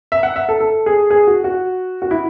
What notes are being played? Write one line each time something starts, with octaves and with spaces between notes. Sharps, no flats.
E5
F#5
E5
A4
A4
G#4
G#4
F#4
F#4
F#4
E4